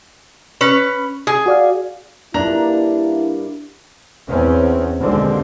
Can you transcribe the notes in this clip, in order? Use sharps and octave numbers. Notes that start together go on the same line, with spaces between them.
C#4 B4
G#4
F#4 D5 F5
G2 G3 A#3 D4 E4 A#5
E2 C4 C#4
D#2 B2 D3 G#3 C4